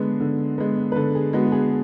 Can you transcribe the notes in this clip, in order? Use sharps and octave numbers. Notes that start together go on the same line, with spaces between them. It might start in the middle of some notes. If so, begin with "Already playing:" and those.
Already playing: D3 G#3 B3
D3
G#3 B3
B4
D3 A4
G#4
G#3 B3 F#4
F#4
G#4